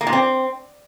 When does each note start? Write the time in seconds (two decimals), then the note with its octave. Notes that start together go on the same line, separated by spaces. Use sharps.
0.01 A#3
0.07 A#2
0.13 C4